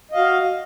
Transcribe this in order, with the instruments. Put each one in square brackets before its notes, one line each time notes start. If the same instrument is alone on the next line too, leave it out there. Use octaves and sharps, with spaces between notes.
[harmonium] D#5
F5
F#4